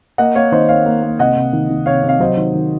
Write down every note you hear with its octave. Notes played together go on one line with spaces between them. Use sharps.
A#3 D#5 F#5
A#3 C#5 F5
D#3 C5 D#5
A#3 C#5 F5
A#3
A#3
C3 D#5 F#5
C3
D#3
D#3
C3 C#5 F5
C3
F5
F#3 C5 D#5
D#3
D#3